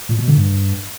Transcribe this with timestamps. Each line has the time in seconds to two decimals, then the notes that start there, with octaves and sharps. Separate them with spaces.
0.09 A#2
0.18 B2
0.28 D3
0.37 G2